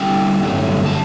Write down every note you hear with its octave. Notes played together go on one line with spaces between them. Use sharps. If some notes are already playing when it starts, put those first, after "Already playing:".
Already playing: D3 G3 C4 G5
G2 D3 F#3 A3
A5